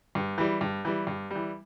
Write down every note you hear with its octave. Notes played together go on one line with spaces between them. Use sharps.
G2
E3 G3
G2
E3 G3
G2
E3 G3